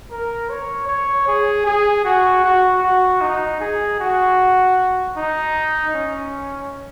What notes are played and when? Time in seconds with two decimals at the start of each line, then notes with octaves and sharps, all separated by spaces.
0.11 A#4
0.50 C#5
0.88 C#5
1.27 G#4
1.66 G#4
2.05 F#4
2.44 F#4
2.83 F#4
3.21 D#4
3.61 G#4
4.00 F#4
5.17 D#4
5.95 C#4